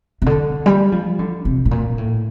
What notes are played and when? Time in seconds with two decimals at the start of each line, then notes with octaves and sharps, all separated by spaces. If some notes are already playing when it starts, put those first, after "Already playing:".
0.22 C3
0.26 D3
0.66 G3
0.92 F3
1.19 D3
1.45 C3
1.65 A2
1.71 A#2
1.98 A2